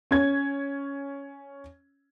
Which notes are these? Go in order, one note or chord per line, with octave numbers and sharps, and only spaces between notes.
C#4 G#6